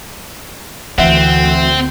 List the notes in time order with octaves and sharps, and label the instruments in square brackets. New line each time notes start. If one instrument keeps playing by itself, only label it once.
[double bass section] D2 [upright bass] E3 [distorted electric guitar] C4 [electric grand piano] E5 F#5